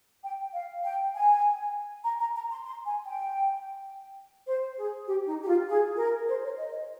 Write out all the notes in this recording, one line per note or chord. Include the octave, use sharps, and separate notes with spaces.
G5
F5
G5
G#5
A#5
A#5
A#5
C6
C6
G#5
G5
C5
G#4
G4
D#4
G4
F4
G#4
A#4
C5
C#5
D#5
D#5